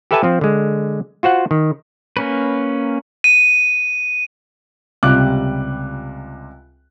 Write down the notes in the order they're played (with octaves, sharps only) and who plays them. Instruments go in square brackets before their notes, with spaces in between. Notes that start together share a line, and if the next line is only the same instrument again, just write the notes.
[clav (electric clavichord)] G4 A4 B4 E5 G#5 A5
F3 C4
D3 G#3
F4 F#4 C5 F#5
D#3
[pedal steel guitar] A#3 C#4 B4
[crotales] D#7
[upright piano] C#2 C3 G3 F4 D6 F#6